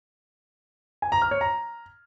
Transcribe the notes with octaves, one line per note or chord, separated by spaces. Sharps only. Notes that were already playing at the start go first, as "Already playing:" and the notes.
G#5
A#5
F6
C#5
A#5